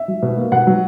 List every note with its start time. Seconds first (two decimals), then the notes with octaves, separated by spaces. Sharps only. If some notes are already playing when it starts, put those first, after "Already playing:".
Already playing: E5
0.08 F#3
0.23 B2
0.37 A#3
0.52 B2 F#5
0.67 F#3